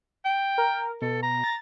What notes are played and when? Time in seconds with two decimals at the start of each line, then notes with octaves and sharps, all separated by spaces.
0.25 G5
0.58 A#4
1.02 B2 A4
1.23 A#5
1.44 A6